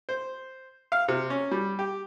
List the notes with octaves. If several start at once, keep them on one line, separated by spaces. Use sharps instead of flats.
C5
F5
C3
C#4
G3
G4